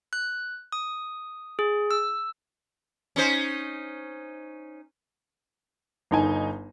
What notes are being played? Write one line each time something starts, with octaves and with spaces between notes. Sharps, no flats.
F#6
D#6
G#4
E6
C#4 D#4 C5
G1 D#4 G#5